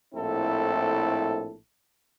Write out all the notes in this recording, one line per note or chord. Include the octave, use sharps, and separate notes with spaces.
A#1 A2 C4 E4 A4